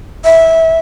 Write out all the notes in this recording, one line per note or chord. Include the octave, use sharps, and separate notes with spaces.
E5